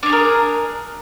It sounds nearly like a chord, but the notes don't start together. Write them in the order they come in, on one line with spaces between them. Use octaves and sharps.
D4 C#5 G#4 A#4